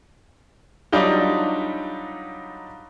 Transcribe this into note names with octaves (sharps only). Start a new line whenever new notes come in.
F#3 G3 D4 D#4 F4 G4